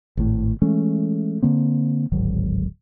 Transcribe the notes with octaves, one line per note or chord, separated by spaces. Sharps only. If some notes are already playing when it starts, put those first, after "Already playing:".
G#1 A2
E3 G#3 A3 C#4
D3 A#3 C4
D1 G#1 F#3